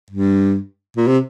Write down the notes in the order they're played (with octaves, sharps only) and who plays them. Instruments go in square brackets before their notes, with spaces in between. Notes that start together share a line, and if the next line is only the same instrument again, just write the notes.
[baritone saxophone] G2
A#2
C3